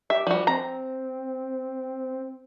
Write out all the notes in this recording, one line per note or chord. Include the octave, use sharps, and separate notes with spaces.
G4 E5
F3 G3 F#4
C4 A#5